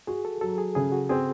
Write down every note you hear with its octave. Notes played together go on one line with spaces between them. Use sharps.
F#4 G#4
A4
F#3 A4
G#4
C#3 G#4
F#4
C4 G#4